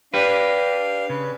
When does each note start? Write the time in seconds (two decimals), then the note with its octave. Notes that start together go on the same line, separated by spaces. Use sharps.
0.14 D4 G4 B4 F5
1.10 C#3 B4